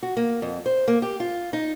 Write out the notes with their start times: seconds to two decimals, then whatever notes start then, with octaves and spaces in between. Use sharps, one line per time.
0.03 F#4
0.17 A#3
0.42 F2
0.66 C5
0.88 A#3
1.02 G4
1.20 F4
1.53 D#4